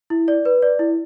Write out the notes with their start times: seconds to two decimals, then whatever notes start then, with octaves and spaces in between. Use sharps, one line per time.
0.10 E4
0.28 D5
0.45 B4
0.62 D5
0.79 E4